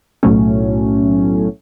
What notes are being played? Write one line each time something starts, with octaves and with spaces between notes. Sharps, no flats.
B1 A2 F#3 A3 C#4